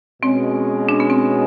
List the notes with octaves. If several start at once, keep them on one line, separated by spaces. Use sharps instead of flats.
B2 G#3 C4 C#4
D4
B3
C4